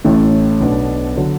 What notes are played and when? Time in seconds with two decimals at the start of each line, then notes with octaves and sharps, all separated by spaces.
0.05 A1 A2 A3
0.60 B1 B2 B3 D4
1.17 D3 F#3 D4